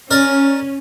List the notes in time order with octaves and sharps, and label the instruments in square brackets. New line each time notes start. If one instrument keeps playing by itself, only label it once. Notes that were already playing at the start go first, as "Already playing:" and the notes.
[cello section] C#4 [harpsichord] A#4 D5